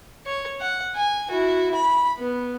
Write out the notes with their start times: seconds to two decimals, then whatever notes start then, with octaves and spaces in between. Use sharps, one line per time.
0.26 C#5
0.60 F#5
0.95 G#5
1.31 E4 F#4
1.75 B5
2.18 B3